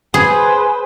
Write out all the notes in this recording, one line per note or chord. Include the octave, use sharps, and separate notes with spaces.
G#4 B4 C5